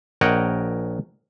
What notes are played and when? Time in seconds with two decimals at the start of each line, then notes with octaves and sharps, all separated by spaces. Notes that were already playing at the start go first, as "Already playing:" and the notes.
0.21 A#1 A#4 C#5 D#5 F#5 G5